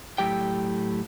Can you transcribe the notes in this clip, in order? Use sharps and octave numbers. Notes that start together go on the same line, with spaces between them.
A2 F#3 G4 G5